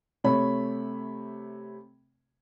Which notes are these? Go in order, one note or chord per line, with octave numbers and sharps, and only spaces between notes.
C3 A3 C#5 B5